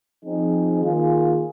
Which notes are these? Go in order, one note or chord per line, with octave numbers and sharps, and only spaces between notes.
F3 C4 D#4 G#4
D#3 A#3 F4 G#4